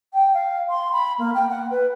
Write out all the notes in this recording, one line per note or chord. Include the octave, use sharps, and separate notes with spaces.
G5
F5
C6
B5
A#3
G5
F#5
B4